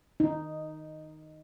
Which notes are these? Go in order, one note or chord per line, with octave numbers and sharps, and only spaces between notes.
D#4